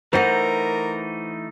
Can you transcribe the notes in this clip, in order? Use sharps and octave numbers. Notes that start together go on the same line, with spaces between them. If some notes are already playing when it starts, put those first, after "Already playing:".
E3 A3 D#4 A#4 C5 F#5